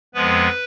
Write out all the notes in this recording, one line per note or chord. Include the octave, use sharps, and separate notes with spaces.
F2 F3 G#3 B3 B4